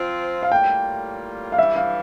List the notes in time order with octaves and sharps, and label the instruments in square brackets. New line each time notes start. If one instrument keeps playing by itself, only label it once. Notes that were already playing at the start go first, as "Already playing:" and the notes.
Already playing: [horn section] F3 C4 F4
[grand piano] F5
[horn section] A2 G3 A#3 F4 [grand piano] G5
[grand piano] F5
[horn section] G2 E3 G3 [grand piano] E5
[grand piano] F5